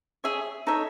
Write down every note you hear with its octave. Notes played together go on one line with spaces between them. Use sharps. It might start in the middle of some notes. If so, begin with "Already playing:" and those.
G#4 C#5 E5
D#4 A4 C#5 E5